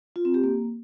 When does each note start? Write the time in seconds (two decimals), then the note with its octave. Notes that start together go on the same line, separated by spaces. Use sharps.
0.16 F4
0.25 C4
0.34 G4
0.44 A#3